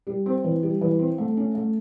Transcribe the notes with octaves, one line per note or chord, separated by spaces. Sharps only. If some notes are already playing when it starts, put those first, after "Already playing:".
G3
C4
E3
G3
E3
C4
A3
C#4
A3